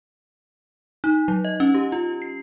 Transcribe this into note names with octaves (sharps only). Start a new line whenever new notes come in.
D#4
F#3
D#5
C#4
G4
F4
C7